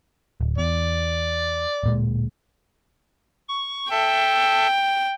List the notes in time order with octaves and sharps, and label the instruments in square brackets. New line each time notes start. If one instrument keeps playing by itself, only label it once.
[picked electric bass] D1
[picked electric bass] E2 [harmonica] D5
[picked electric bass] D1 A#2 G#3
[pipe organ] C#6
[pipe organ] A4 E5 A5 [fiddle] G5